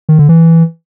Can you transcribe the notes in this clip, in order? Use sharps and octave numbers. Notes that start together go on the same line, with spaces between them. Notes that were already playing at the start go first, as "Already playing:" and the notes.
D#3
D3
E3